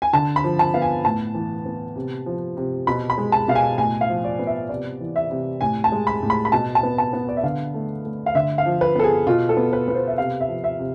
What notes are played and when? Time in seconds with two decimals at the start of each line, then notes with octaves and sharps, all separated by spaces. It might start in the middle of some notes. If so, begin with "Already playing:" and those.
0.02 G#5
0.13 D3 A5
0.36 B5
0.44 F3
0.59 A5
0.74 B3 F5
0.82 G#5
1.05 A2 A5
1.35 E3
1.66 B3
1.96 C3
2.26 F3
2.57 C3
2.87 B2 B5
3.10 B5
3.18 G#3
3.32 A5
3.48 B2 F5
3.55 G#5
3.78 A2 G#5
4.01 F5
4.09 F3
4.24 D5
4.39 B3
4.47 E5
4.69 C3 D5
5.01 E3
5.16 E5
5.30 C3
5.61 A2 G#5
5.84 A5
5.92 G#3
6.07 B5
6.23 A2
6.30 B5
6.45 B5
6.52 B2 A5
6.75 A5
6.83 B3
6.98 A5
7.13 B3
7.29 D5
7.37 E5
7.43 D3 F5
7.74 A3
8.05 A3
8.26 F5
8.35 D3 E5
8.58 F5
8.66 F3
8.81 B4
8.96 B3 A4
9.04 G#4
9.27 B2 F4
9.49 A4
9.57 B3
9.73 B4
9.88 B3 B4
9.95 C5
10.08 E5
10.18 C3 F5
10.41 E5
10.48 F3
10.64 E5
10.79 C3